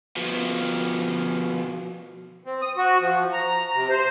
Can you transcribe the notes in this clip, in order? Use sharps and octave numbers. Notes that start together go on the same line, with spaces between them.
B2 F3
C4
D#6
F#4
F3
A#5
C3
C5